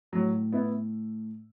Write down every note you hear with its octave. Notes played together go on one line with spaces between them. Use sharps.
A2 F#3
B3 E4